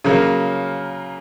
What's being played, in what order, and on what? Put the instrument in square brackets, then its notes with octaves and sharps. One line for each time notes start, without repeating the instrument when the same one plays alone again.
[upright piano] C#3 F#3 A#3